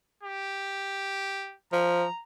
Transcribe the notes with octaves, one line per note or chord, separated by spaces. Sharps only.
G4
F3 A#5